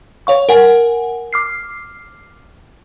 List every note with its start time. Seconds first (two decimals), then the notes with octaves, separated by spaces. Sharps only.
0.27 C#5 F5 C#6
0.49 A#4 F#5 G#5
1.33 D6 F6 C7